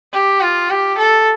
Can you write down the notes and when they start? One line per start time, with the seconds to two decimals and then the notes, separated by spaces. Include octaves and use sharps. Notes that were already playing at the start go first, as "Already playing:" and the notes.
0.13 G4
0.42 F4
0.70 G4
0.98 A4